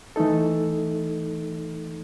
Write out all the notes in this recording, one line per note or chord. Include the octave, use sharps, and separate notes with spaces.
E3 A3 D#4 A4